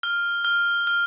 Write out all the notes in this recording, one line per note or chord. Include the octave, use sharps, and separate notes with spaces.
F6
F6
F6